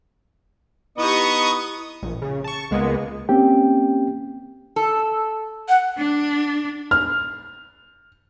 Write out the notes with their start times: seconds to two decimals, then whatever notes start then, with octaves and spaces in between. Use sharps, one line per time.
0.98 B3 D#4 E4 G4 D#5 C#6 D#6
2.03 A#1
2.22 C#3
2.44 A5 C#6
2.71 C#2 G#3 A#3 B3
3.29 A#3 C4 C#4 G4 G5
4.76 A4
5.69 F#5
5.98 D4
6.91 F6